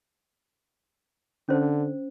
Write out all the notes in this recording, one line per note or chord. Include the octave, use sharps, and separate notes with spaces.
D3 C#4 C5